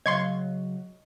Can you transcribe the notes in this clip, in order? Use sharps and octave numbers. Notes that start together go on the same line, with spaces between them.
C#3 F#3 D#5 F5 C6 C#6 G#6